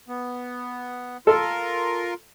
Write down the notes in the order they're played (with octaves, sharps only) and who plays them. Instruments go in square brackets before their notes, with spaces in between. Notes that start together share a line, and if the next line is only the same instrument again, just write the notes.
[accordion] B3
[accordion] F4 A#4 [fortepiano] A4